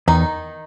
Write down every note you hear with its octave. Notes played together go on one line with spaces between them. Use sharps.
E2 D#3 D#4